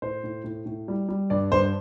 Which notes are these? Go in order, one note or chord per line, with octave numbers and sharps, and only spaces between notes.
A2 C5
A2
A2
A2
G3
G3
G2 D5
G2 C5